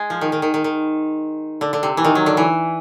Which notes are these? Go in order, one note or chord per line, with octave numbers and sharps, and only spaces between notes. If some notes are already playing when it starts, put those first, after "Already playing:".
Already playing: G#3
F3
D#3
D#3
D#3
D#3
D#3
D3
D3
C3
E3
D#3
F#3
D3
E3